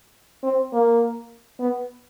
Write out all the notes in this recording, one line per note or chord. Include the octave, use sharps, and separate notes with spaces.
C4
A#3
B3